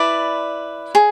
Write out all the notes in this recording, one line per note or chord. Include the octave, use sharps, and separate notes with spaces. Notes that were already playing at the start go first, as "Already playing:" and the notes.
Already playing: E4 B4 D5 A5
G#4